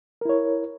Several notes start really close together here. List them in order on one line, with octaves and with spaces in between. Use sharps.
A#4 E4 C#5